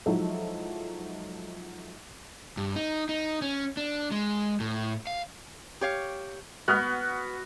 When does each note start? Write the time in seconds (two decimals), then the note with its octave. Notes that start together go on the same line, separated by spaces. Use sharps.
0.06 F3 F#3 G#3 D#4 E4 A4
2.57 G2
2.76 D#4
3.09 D#4
3.42 C#4
3.77 D4
4.11 G#3
4.60 A2
5.07 F5
5.81 G4 C#5 F5
6.68 B3 F#4 B4 D#6 F6 F#6